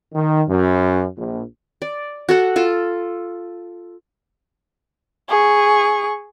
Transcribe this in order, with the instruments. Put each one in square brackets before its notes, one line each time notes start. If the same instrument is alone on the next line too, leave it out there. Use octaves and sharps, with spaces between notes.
[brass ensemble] D#3
F#2
A#1
[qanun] D5
F#4 A4 F#5
F4 A4
[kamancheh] G#4 C#6